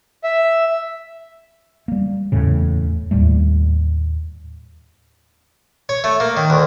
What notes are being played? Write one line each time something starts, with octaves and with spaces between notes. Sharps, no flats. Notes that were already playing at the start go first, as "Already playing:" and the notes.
E5
G3 A#3
D1 E2 A2 C#3
D#2 A2 G3 A3
C#5
A3
A#3
D#3
D2